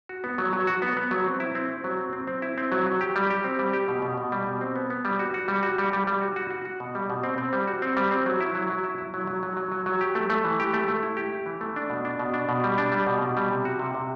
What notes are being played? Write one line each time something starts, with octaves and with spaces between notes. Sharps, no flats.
F#4
B3
F#3
F#3
F#4
B3
B3
F#3
C4
E4
C4
C4
F#3
C4
C4
C4
E4
C4
F#3
F#3
G4
G3
G4
C4
G3
G4
B2
B2
B2
G3
B2
C4
B3
B3
G3
F#4
F#4
G3
F#4
G3
G3
G3
F#4
F#4
F#4
F#4
B2
G3
B2
C4
C4
G3
F#4
C4
G3
C4
F#3
E4
F#3
F#3
E4
E4
F#3
F#3
F#3
F#3
F#3
F#3
G4
A3
A3
E3
G4
A3
A3
E4
G4
E4
E3
A3
D4
B2
D4
B2
D4
B2
G3
D4
G3
B2
B2
G3
C3
F#4
C3
C3